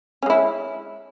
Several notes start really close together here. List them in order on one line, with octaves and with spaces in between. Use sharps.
C#4 G#3 E4